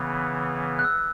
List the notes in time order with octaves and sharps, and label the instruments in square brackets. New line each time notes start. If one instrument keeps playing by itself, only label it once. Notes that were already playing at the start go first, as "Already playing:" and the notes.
Already playing: [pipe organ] C#3 E3 B3
[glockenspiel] F#6
E6